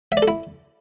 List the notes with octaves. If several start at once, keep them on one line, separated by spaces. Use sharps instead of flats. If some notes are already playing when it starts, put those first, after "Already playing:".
E5
D5
A4
E4